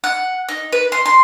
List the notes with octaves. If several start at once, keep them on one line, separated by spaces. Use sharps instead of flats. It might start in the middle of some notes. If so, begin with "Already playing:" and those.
F#5
D#4
B4
C6
C6